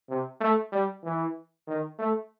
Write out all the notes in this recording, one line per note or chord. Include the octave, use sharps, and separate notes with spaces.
C3
A3
G3
E3
D#3
A3